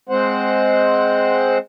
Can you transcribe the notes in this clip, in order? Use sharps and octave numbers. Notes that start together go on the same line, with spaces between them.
G#3 C4 C5 F#5